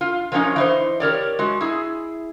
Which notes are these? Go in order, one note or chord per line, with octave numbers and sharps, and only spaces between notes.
F4
F3 F#3 A#3 C#4 D#4
E3 D#4 C5
G4 A#4 C#5 D5
G#3 F#4
E4 G#4